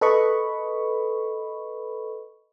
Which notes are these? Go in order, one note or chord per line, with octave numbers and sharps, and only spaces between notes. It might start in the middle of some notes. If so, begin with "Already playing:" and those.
A4 B4 D#5 B5 C#6